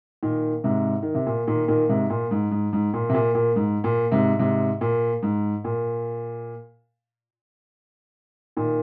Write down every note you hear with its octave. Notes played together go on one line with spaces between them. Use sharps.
A#2 D#3
G#2 C3
D#3
C3
A#2
A#2 D#3
A#2 D#3
G#2 C3
A#2
G#2
G#2
G#2
A#2
C3
A#2
A#2
G#2
A#2
G#2 C3
G#2 C3
A#2
G#2
A#2
A#2 D#3